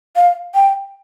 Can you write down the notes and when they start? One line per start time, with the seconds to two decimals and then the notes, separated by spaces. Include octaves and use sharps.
0.16 F5
0.55 G5